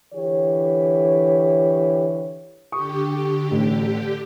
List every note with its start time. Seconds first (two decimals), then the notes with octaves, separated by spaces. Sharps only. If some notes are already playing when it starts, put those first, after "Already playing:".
0.13 D3 E3 G4 C#5
2.72 D3 G4 C#6 D#6
3.51 A1 A2